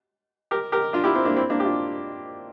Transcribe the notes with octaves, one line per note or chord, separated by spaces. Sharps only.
G4 A#4
G4 A#4
D4 F4
E4 G4
C4 E4
A#3 D4
C4 E4
A#3 D4
G4
D4 F4